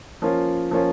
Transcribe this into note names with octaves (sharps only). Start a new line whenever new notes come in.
F3 A#3 C#4 F4
F3 A#3 C#4 F4